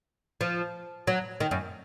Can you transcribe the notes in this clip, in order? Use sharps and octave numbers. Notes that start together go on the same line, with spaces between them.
F3
F#3
D#3
F#2